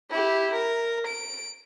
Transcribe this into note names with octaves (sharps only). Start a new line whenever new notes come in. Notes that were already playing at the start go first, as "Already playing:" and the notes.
E4 G4
A#4
D7